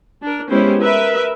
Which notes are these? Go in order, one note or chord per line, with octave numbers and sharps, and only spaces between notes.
D4 A#4
G#3 B3 C#4 E4 G4 C5
A#4 B4 E5